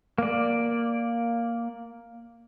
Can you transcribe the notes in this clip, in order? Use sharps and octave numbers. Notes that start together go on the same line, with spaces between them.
A#3 D5